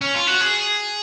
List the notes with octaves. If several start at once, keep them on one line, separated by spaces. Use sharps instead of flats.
C#4
F4
F#4
G#4